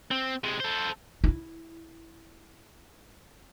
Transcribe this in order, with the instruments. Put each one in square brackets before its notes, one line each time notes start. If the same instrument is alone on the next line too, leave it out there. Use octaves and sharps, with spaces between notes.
[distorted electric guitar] C4
C3 G#3
A4 C5
[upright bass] D#4 E4